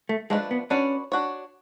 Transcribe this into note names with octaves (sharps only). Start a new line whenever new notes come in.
A3
F3 G#3 A3 D4 F#4 B4
B3
C#4 D4 F#4 B4 D5
D4 F#4 C#5